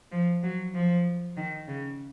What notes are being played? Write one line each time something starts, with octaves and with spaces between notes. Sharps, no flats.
F3
F#3
F3
D#3
C#3